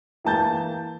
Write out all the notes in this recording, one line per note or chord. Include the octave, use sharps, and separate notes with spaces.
E3 A#3 A5 G6 A6